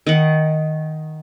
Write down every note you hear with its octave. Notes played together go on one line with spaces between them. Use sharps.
D#3 F#5